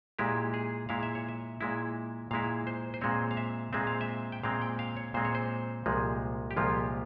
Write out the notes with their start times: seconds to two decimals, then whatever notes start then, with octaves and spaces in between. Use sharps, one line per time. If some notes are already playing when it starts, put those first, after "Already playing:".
0.19 A#2 G#3 E4 G4
0.54 G#4
0.89 A#2 G#3 E4 F5
1.03 E5
1.15 C#5
1.29 E5
1.61 A#2 G#3 E4
2.31 A#2 G#3 E4 F5
2.67 C5
2.94 C5
3.01 A#2 G#3 C4 C#5
3.31 F5
3.37 E5
3.73 A#2 G#3 C4 E5
3.87 F5
4.01 E5
4.32 G5
4.43 A#2 G#3 C4 F5
4.62 G5
4.79 F5
4.97 C#5
5.14 A#2 G#3 C4 C5
5.25 C#5
5.35 C5
5.86 C2 A#2 F3 G#3
6.51 G4
6.56 C2 A#2 F3 G#3 F4